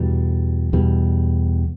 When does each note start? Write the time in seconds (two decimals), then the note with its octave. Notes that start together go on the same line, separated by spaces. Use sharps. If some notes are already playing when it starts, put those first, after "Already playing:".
Already playing: E2 B2 G3
0.73 E2 B2 G3